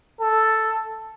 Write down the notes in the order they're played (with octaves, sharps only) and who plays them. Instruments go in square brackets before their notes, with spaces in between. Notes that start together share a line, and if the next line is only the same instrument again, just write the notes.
[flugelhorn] A4